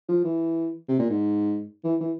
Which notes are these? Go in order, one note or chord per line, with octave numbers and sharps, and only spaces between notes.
F3
E3
C3
A#2
G#2
E3
E3